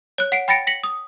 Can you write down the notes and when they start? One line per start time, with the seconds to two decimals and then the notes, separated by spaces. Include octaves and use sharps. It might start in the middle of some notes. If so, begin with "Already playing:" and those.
0.18 C#5 F#6
0.32 F#5 C7 D7
0.48 G5 B5 A6 A#6 C#7 D7
0.67 A#6 B6 C#7 F#7
0.84 D#6